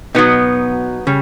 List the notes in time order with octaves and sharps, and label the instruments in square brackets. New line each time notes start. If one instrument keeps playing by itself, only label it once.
[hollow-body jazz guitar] B2 [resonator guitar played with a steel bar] F#3 B3 D#4
[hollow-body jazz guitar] C#3 [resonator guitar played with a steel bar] G3